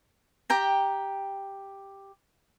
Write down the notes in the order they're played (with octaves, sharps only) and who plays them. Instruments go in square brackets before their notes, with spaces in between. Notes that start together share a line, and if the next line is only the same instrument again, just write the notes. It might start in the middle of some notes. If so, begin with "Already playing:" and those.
[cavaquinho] G4 G5 A#5